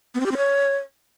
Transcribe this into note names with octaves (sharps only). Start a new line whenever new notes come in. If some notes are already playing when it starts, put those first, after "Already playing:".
B3
C4
G4
C4
C#5